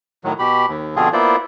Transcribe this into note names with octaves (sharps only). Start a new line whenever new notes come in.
A2 D#3 F#3
B2 G4 B5
D#2
B2 D3 F3 C4 F4 G#4
A#3 B3 E4 F4 C5 D5